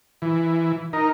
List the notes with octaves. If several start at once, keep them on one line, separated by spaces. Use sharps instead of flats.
E3
D#4 A#4